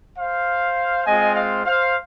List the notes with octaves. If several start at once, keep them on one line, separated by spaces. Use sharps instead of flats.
C5 F5
G#3 C4 F4 D#5 G#5
C5 F5
C5 F5